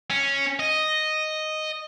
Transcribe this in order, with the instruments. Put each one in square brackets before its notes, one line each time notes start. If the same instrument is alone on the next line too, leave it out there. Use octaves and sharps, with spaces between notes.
[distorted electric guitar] C#4
D#5